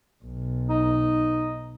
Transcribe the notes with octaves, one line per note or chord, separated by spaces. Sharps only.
B1
D#4